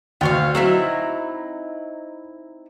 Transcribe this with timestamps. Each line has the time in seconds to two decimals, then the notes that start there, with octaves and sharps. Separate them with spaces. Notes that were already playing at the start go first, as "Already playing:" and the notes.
0.21 D2 F4 C#5 F5
0.55 F#3 C4 D#4 E4